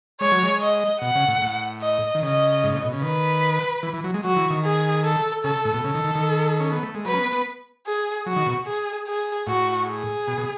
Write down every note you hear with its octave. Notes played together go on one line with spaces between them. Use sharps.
G#3 C#5
F#3
G#3
D#5
B2 F#5
C#3
A2
A2
D#5
D#3
C#3 D#5
G#2
A2
B2
C#3
D#3 B4
E3
E3
F#3
G#3
F#3 F#4
E3
D#3
G#4
A4
C#3 A4
A2
B2
C#3 A4
D#3
D#3
D#3
C#4
B3
A3
G#3
F#3 B4
C#4
B3
B3
G#4
F#3 F#4
D#3
B2
G#4
G#4
A2 F#4
G#4
B2
B2